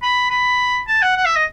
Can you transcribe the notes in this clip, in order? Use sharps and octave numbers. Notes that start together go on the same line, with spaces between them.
B5
B5
A5
F#5
F#5
E5
D#5